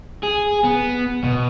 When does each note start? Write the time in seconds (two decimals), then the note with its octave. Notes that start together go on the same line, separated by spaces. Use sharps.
0.23 G#4
0.65 B3
1.24 B2